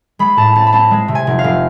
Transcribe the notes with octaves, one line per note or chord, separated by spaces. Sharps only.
G#3 B5
A2 A5
C4 A5
B5
C4 A5
G#3
C3
G#5
F1
F5
F1